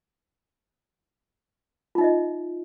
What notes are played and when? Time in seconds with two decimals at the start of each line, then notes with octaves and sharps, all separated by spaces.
1.95 F4
1.98 D#4
2.01 E5
2.04 D#5